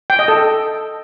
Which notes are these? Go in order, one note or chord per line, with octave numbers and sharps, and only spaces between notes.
G5
D#5
A4